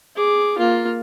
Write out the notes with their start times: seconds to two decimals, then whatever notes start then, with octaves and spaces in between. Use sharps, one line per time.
0.16 G#4 D6
0.58 A#3 F4